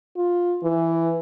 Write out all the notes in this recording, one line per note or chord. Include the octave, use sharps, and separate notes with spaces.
F4
E3